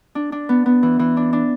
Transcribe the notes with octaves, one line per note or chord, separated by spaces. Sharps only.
D4
D4
B3
B3
E3
E3
D4
D4